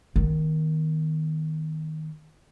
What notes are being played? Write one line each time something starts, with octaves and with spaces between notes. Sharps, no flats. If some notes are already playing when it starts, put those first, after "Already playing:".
D#3 B3